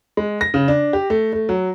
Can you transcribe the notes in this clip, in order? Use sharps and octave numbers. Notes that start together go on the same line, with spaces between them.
G#3
A#6
C#3
D4
G4
A3
A3
F#3